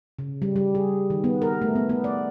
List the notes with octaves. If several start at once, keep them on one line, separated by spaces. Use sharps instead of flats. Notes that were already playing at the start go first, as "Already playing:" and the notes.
C#3
G3
G3
G#4
D#3
B3
A#4
A3
B3
B3
D5